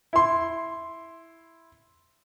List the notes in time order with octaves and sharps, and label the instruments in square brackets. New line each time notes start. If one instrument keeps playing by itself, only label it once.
[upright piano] E4 C6